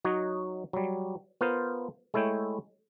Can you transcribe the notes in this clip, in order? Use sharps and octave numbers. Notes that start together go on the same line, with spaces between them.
F#3 D#4 F#4 C#5 D#5
F#3 G3
B3 F4 A#4 C5
G#3 A3 E4 C#5 G5